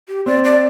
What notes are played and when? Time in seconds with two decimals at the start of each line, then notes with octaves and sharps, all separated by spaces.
0.08 G4
0.26 C4 D5
0.44 D5